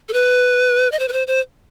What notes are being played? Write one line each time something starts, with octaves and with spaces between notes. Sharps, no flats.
A4
B4
D#5
C5
B4
C5
C5